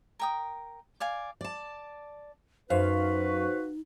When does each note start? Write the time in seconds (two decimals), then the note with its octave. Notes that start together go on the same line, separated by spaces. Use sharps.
0.19 A#4 G5 D#6
1.00 D5 F5 G#5
1.41 D5 A5
2.70 F#2 D#4 F#4 B4 C5 F5